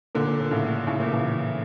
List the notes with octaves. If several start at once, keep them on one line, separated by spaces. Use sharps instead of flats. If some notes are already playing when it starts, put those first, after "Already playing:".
A#2 D3
A#2
A#2
A2 C#3
A2 C#3
A#2
C#3 E3